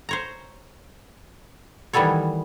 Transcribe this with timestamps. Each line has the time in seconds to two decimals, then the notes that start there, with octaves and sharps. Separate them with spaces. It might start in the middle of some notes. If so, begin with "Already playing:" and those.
0.09 C5 C#5 A#5
1.93 D#3 E3 G3 B3 A4 C#5